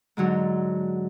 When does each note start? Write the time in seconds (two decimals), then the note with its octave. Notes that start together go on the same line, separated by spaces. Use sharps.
0.17 G#2 D3 F#3